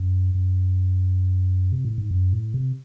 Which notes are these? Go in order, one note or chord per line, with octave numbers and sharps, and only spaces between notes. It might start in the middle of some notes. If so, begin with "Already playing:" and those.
Already playing: F#2
F#2
C3
A2
G#2
F#2
A2
C3